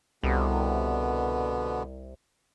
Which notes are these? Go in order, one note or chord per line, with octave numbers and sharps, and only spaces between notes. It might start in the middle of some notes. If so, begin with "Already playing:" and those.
C2 B2 D3 B3